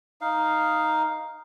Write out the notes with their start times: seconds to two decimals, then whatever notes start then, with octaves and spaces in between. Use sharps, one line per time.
0.21 D#4 F5